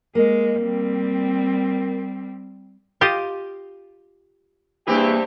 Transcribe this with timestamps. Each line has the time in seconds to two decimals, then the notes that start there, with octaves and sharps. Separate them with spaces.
0.15 G#3 A#3
0.59 G3 C4
3.01 F4 G4 D#5
4.87 G2 E3 A#3 C4 G4 G#4 G5